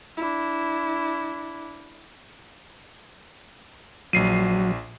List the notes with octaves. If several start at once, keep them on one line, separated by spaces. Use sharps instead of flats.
D4 E4
A#1 F#3 C7 D#7